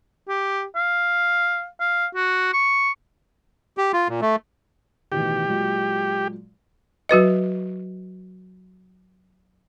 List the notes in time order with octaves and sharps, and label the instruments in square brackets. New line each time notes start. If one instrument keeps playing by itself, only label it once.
[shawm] G4
F5
F5
F#4
C#6
[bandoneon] G4
F4
A#2
A3
[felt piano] A1 B2 D#3 [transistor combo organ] G4
[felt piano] A#2 F#3 G#3
[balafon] F#3 F#4 B4 D#5